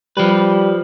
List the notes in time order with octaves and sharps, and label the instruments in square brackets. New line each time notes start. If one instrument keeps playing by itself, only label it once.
[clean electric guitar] F3 B4 [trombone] G3